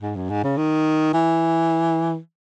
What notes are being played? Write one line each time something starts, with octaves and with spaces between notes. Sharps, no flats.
G#2
F#2
G#2
C#3
D#3
E3